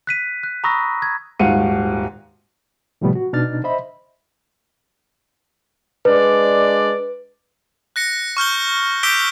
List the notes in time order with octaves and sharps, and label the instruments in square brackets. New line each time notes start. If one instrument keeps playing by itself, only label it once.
[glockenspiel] F#6 B6 D#7
F#6
A#5 B5 C#6 D#6 E6 A#6
G#6
[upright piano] D#1 G#2 F#4 F5 C#7 D#7
[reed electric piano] A2 C3 F3 G3 A3 B3
F#4
B2 D4 D#4 F6 A6
C5 D#5 E5 B5
[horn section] G#3 D4 D5 [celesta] B4
[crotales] F#6 A#6 C#7
C#6 F6 G6 G7
D6 E6 G6 B6 D7 G7